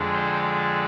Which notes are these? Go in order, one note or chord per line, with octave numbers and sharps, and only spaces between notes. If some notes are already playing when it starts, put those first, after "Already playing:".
Already playing: F2 D3 G#3 D4
C5